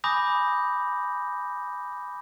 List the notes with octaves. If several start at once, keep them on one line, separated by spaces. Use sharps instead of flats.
G#5 B5 D6 D#6 G6 A#6